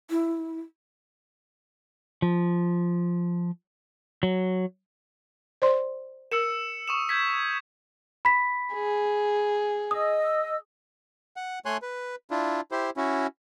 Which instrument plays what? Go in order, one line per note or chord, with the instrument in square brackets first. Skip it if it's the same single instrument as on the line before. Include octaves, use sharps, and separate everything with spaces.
[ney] E4
[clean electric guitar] F3
F#3
[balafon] C5 D5 C6
[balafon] A#4 [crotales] E6 C#7 E7
[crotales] C#6 D#6 E7
G6 G#6 B6
[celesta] B5 B6
[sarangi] G#4
[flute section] D#5 E6 [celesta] D#6
[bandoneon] F#5
A3 C#5 G#5 C6 F#6
B4
D4 E4 F4
E4 G4 C5
C#4 E4 F#4